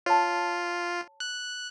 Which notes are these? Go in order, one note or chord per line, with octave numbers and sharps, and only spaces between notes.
F4 C#5 A5
F#6